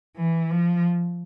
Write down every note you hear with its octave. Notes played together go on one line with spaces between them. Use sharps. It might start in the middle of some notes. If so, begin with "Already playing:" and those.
E3
F3